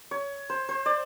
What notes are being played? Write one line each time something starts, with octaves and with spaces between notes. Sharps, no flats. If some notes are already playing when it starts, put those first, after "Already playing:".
C#5
C5
C5
D5